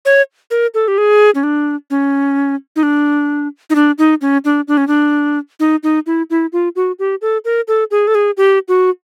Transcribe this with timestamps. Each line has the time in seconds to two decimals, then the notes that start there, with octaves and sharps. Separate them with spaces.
0.05 C#5
0.51 A#4
0.74 A4
0.88 G4
0.98 G#4
1.35 C#4
1.43 D4
1.90 C#4
2.76 D#4
2.83 D4
3.70 D#4
3.75 D4
3.98 D#4
4.21 C#4
4.45 D4
4.68 D4
4.77 C#4
4.88 D4
5.60 D#4
5.83 D#4
6.06 E4
6.30 E4
6.53 F4
6.76 F#4
6.99 G4
7.21 A4
7.45 A#4
7.68 A4
7.91 G#4
8.07 A4
8.15 G#4
8.37 G4
8.68 F#4